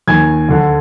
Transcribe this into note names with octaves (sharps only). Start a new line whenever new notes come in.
D#2 D#3 G#5 G#6
D2 D3